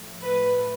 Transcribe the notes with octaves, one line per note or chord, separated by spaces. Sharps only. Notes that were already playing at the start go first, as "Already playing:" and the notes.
Already playing: A2 F3 A3
B4